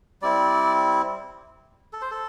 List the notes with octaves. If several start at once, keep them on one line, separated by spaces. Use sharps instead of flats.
G3 C4 E4 D5
A4
C5
A4